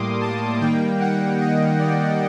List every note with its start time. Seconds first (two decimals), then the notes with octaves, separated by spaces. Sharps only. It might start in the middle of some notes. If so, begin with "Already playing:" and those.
Already playing: A2 G3 A#3 C6 D6 D#6
0.21 A5
0.60 D#3 G3 A#3 G5
1.00 F#5
1.40 D#5
1.79 D5